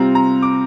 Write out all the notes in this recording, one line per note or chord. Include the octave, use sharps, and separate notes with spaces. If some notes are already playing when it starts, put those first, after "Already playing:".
Already playing: C3 G3 C4 F4 A#5
A#5
D6